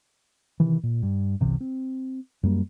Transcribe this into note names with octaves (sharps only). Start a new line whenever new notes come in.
C3 D#3 E3
A#2
G2
G1 C2 C3 E3
C4
F#2 G3 A#3